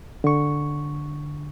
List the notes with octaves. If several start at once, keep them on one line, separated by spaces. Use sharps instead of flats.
D3 C#6